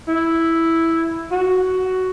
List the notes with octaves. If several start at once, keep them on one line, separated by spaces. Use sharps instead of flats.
E4
F#4